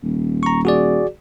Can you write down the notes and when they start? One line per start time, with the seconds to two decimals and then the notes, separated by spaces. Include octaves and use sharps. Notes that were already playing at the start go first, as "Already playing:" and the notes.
0.03 D#1
0.43 A#5 C#6
0.65 F#4 G#4 D5